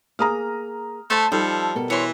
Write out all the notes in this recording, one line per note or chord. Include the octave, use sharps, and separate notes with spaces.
A#3 G#4 A#5 D#6 F6
A3 C5 A5
F3 G3 D#4 A4
B2 A4 A#4
E3 C#5 C6